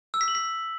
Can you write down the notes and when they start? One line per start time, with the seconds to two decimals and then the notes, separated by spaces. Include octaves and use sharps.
0.14 E6
0.21 B6
0.28 F#7
0.35 B6